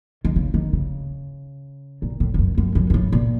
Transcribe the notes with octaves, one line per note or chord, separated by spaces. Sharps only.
D#3
C#3
D#3
C#3
A#2
A2
F2
F#2
F#2
F#2
F#2
A2
A#2